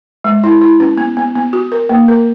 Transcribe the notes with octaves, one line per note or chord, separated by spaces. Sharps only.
G#3
E4
E4
C#4
B3
B3
B3
F#4
A#4
A#3
A#4